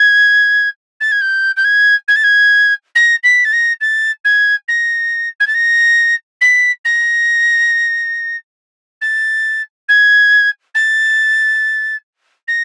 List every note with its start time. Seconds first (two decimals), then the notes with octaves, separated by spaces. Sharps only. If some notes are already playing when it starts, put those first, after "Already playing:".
Already playing: G#6
1.00 A6
1.11 G#6
1.21 G6
1.56 G6
1.64 G#6
2.08 G#6
2.16 A6
2.23 G#6
2.95 A#6
3.23 B6
3.44 A6
3.52 A#6
3.81 A6
4.24 G#6
4.68 A#6
5.40 G#6
5.47 A6
5.54 A#6
6.41 B6
6.85 A#6
9.01 A6
9.88 G#6
10.74 A6
12.48 A#6